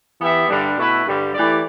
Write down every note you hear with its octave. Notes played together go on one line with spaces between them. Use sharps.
E3 B3 G4 E5
G2 D3 G3 D4
B2 A3 E4 B4
G2 D3 G3
E3 A3 G4 D5